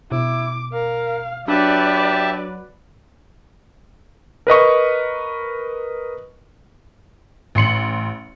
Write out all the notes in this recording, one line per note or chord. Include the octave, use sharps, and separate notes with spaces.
B2 E4 D6
A#4 F5
F#3 D4 G4 B4 D5 E5 A5
A#4 B4 D#5 C#6
A1 C6 C#7 F#7